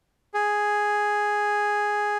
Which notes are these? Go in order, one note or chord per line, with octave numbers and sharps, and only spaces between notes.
G#4